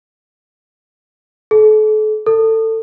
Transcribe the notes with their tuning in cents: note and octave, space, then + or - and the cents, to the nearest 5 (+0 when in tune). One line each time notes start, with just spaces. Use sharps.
A4 -40
A4 +20